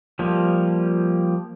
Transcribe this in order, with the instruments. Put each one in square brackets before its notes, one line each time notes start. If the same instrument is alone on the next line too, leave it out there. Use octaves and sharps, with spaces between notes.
[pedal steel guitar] F3 G3 A#3